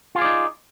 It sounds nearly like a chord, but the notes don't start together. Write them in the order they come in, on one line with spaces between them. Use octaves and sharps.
F4 G#4 D5 D#4